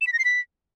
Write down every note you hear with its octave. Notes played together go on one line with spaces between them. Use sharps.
E7
B6
A#6
C7
B6